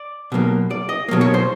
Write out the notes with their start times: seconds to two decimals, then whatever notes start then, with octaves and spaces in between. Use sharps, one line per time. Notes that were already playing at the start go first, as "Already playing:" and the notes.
Already playing: D5
0.32 B2 F#3 A#3
0.71 D5
0.89 D#5
1.09 B2 F#3 A#3
1.21 C#5
1.34 C5